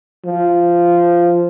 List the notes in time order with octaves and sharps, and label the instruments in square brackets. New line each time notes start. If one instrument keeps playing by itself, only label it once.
[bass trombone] F3